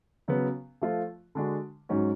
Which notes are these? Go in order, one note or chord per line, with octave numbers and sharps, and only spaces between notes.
C#3 F#3 B3
F3 A3 F4
D3 G#3 D4 F#4
G#2 F#3 C#4 F#4